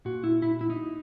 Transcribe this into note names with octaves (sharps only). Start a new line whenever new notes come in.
A#2 F#4
E4
E4
E4
D#4